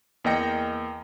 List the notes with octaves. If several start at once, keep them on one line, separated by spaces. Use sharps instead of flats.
E2 A#3 D#5 G5 A#6 C#7